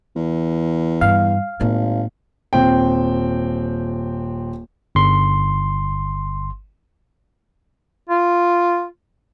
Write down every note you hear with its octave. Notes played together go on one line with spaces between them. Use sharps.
E2
G2 F5
G#1 A2 A#3
D#1 C4 G5
G1 C6
F4